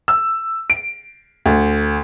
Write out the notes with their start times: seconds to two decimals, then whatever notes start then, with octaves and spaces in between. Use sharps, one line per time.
0.08 E6
0.70 D7
1.46 D2